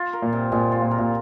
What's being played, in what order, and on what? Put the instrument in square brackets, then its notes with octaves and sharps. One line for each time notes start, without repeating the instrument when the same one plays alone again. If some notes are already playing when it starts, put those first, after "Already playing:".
Already playing: [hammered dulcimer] F4
A#4
[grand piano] A#2
[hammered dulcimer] C3
[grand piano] A#2 [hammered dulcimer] G#3
[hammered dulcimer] F4
[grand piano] A#2
[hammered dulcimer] A#4
[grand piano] A#2